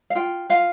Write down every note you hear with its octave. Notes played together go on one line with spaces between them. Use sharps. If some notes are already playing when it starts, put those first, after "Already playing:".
F5
F4 G5
F4 F5